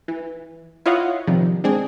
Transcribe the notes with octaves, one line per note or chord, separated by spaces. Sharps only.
E3
E4 F4 C#5 D#5 F5 F#5
C3 D#3 F3 G3
G#3 C4 D4 G#4